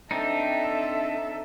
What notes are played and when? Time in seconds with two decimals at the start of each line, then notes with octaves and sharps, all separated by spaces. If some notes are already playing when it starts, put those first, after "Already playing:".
0.11 C4 D4 D#4 A4 E5